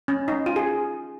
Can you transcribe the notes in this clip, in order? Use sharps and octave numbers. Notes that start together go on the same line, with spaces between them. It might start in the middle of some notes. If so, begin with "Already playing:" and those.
C#4
D#4
F4
G#4